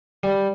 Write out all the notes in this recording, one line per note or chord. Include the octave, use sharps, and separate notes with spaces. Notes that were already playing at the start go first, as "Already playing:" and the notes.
G3